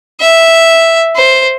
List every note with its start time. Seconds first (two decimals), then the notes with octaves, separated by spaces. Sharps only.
0.20 E5
1.16 C5